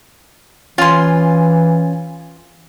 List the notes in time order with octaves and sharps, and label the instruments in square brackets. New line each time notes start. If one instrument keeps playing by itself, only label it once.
[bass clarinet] E3 [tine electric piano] C#4 G#5 [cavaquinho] F4 C6